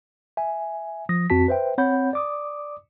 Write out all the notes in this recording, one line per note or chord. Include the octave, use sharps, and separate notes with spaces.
E5 G#5
F3 D#6 A#6
F2 C4 F#4 A5 B6
B4 C5 E5 G5
C4 C#5 F#5 B5 G6
D5 D6 D#6